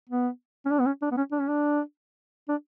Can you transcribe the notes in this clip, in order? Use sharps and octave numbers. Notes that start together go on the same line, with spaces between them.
B3
C#4
D4
B3
C#4
D4
B3
C#4
D4
C#4
D4
D4